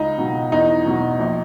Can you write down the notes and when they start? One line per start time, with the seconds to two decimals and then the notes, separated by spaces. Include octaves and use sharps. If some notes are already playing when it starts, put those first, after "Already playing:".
Already playing: C#2 D#4
0.18 B2 F#3
0.52 E2 D#4
0.86 B2 F#3
1.19 A#1